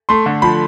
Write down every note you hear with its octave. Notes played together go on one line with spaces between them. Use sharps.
A3 C6
D3
F3 B5